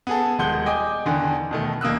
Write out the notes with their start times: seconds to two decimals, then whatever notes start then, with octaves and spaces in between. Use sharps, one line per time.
0.07 B3 G#4 A4
0.39 D#1 G#3 F#5 C6 G6 G7
0.66 D#5 G5 G#5 D6
1.06 E2 D3 D#3
1.51 B2 D#3 A3
1.81 D#1 A#3 D#6 E6 F#6